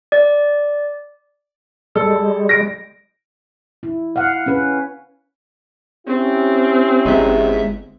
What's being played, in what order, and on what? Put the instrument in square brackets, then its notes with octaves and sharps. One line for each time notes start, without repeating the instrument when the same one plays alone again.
[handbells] D5
[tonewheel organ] G3 G#3 [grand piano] A4
[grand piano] A#6 D7
[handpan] E4
F5 F#5
C#4 B4
[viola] C4 [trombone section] C#4 E4 G4
[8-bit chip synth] G1 E5 [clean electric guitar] G#3 B3 D#4